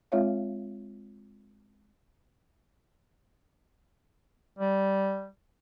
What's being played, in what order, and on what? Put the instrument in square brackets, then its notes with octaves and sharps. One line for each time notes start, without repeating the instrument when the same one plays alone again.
[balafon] G#3 C4 F4 C#5 E5 F5
[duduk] G3